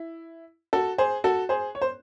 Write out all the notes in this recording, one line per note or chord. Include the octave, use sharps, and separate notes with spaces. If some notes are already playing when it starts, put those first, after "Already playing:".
Already playing: E4
F#4 A4
G#4 C5
F#4 A4
G#4 C5
C#5
C5